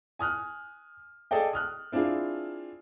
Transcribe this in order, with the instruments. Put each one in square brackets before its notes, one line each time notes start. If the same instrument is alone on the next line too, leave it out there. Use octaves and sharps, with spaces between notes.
[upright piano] G#5 D#6 F6 F#6
G#4 A4 D5 D#5 G5
D#6 F6 F#6
C4 D4 E4 F4 G#4